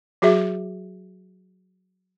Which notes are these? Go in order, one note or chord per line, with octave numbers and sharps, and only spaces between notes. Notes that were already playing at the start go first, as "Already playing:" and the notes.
F#3 F#4 G#4 E5